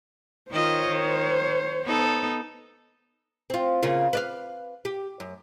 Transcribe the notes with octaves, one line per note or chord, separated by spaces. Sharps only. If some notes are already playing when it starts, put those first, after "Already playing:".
D#3 F4 C5 C#5 D#5
D#3
B3 D#4 A4
C4 F4
C#3 A#3 F4
B4 D5 F5
G4
F#2